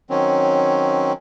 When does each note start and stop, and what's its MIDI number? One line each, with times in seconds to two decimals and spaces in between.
0.10 1.13 51
0.10 1.13 54
0.10 1.13 60
0.10 1.13 61